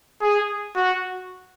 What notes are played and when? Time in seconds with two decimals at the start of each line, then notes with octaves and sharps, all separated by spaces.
0.22 G#4
0.76 F#4